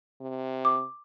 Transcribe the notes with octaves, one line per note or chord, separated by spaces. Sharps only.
C3
D6